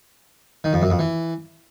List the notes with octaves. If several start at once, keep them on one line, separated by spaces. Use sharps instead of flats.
D#3
F2
F#2
F2
E3